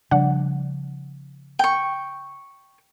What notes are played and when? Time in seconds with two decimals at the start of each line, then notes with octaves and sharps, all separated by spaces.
0.11 C#3 F3 G3 D4 F#5
1.59 G5 C#6